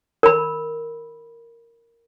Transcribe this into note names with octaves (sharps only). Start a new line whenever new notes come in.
A#4 B5